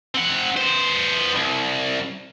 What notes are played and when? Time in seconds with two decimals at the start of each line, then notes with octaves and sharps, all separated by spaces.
0.14 C4 F#5
0.56 B3 C5
1.35 C2